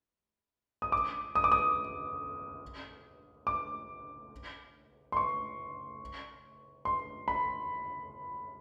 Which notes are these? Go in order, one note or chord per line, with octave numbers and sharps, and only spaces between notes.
D#6
D6
D#6
D6
D#6
D6
C6
C#6
C6
B5